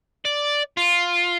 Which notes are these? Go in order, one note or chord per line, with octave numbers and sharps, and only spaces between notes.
D5
F4